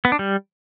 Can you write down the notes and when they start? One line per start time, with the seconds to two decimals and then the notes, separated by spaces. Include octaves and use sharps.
0.05 B3
0.12 D4
0.19 G3